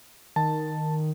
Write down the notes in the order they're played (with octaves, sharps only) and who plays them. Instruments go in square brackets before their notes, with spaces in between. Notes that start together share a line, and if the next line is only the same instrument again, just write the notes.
[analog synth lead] D#3 [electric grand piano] A5